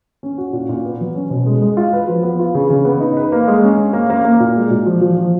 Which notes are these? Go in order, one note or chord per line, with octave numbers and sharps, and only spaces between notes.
C#4
F#4
A#2
A#2
B3
F#3
C#4
B2
G#3
G#3
F4
B4
F3
B3
F4
C#3
C#3
B3
D#4
B4
A#3
G#3
C#4
C#4
A#3
A#3
A#3
A#2
G#3
A#2
F3
F3
F3